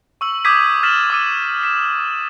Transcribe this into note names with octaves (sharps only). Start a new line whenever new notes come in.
C#6 E6 F#7
D6 D#6 G6 G#6 B6 D#7
F6 A6 B6 E7 F#7
D6 E6 D#7
B6 E7